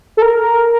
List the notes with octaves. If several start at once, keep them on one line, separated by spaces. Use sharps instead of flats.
A4
A#4